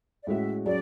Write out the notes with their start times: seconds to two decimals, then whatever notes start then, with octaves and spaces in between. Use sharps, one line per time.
0.23 D5
0.27 A2 G#3 C#4 F#4 E5
0.66 F#3 C#4 G#4 D5